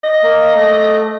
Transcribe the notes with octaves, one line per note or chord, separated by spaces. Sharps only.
D#5
A#3
A3